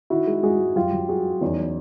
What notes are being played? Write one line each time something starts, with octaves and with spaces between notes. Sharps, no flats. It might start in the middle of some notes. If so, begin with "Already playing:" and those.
D#3 E4 F#4
G#3
G#2 F#4 G#4
G#2
F#2 F4 G4
F#2
G3 F#4 G#4
G3
E2 C#4 D#4
F#3